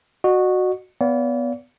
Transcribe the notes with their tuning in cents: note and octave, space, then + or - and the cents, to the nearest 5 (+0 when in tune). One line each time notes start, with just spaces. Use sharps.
F#4 -5 D#5 -40
B3 +5 D5 -40 F5 +0